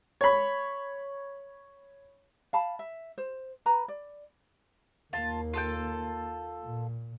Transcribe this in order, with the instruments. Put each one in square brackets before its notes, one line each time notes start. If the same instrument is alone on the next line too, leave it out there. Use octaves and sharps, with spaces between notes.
[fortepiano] C#5 B5
[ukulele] F5 A5 B5
E5
C5
B4 A#5 B5
D5
[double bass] D#2 A#3 [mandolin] F4 A5
[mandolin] F4 A4 G5
[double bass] A#2